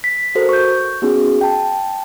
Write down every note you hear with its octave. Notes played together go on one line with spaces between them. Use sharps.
B6
F#4 A4 A#4 C5
C#6 G6
B3 C#4 D#4 F#4 G#4
G5 A5